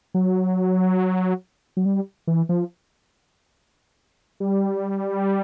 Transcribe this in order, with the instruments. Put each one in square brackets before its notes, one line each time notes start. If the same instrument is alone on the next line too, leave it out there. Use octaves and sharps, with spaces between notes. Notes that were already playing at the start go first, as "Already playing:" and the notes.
[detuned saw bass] F#3
F#3
G3
E3
F3
G3